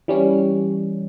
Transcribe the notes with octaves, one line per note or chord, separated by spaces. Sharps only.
E3 G3 C#4